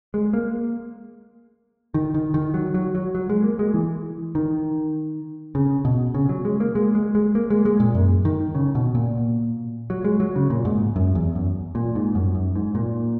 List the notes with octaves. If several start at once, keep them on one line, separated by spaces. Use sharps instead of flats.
G#3
A#3
D#3
D#3
D#3
F#3
F#3
F#3
F#3
G#3
A#3
G#3
E3
D#3
C#3
B2
C#3
F#3
G#3
A#3
G#3
G#3
G#3
A#3
G#3
G#3
A#2
F#2
D#3
C#3
B2
A#2
F#3
G#3
F#3
C#3
A#2
G#2
F#2
E2
F#2
A#2
G#2
F#2
F#2
G#2
A#2